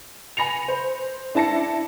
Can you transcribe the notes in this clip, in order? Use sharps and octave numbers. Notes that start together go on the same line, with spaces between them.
G#5 B5 A#6 C#7 F7
C5
D4 E4 A5 A#6 C#7